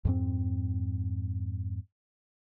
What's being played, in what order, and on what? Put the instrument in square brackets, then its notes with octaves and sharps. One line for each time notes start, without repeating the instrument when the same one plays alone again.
[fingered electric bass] F2 G#2 C4